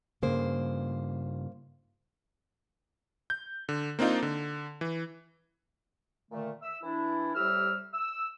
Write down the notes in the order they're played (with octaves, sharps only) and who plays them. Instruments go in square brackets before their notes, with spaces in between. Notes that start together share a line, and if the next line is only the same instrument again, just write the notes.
[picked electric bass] G2 C#3 [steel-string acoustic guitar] A#3 C5
[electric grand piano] G6
D3
A#3 C4 D4 D#4 F4
D3
E3
[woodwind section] A#2 D3 D#3 A3
E5 E6
E3 D4 E4
A2 C3 G3 G4 E6 F6
E6